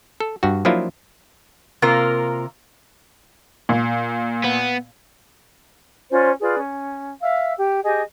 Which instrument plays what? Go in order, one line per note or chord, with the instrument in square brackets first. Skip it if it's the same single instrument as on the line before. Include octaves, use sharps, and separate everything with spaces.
[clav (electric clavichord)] A4
G2 F#4
F3 F#3 A#3 D4 E4 F4
[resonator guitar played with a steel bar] C3 A#3 F4 A#4
[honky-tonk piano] A#2
[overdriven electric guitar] B3
[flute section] C#4 F4 C5 D5
F4 G#4 B4 D5
C#4
E5 F5 E6
G4
G4 G#4 D#5 G#5